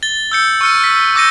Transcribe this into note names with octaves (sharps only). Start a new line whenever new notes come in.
A6 G7
E6 G6 C#7
C#6 E6 F6 C#7 D#7
E6 B6
D6 E6 G6 A#6 C#7 D#7